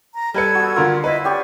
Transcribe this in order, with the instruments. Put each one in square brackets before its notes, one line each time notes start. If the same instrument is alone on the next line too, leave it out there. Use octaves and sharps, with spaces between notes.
[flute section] A#5
[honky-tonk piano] G3 B4 C#7 [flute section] A4 G#6
[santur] B3 F#4
[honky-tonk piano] D3 A#4 [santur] F4
[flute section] E4 D#5 [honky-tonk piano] B4
[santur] C#4 G4 C#6 [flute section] D5